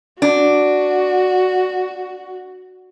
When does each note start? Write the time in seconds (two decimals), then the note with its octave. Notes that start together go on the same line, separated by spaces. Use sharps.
0.22 D4 F#4